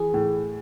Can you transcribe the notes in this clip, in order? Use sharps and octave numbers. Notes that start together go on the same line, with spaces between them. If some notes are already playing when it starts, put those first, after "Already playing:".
Already playing: E3 G#4
A2